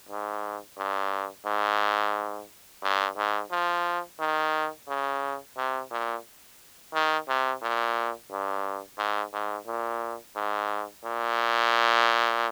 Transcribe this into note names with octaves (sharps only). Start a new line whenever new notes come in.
G#2
G2
G#2
G2
G#2
F3
D#3
C#3
C3
A#2
D#3
C3
A#2
G2
G#2
G#2
A#2
G#2
A#2